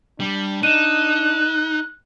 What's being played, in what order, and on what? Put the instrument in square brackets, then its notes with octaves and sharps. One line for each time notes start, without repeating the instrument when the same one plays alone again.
[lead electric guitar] G3 [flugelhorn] D4
[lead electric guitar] D#4 [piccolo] F#6 [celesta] D#7 E7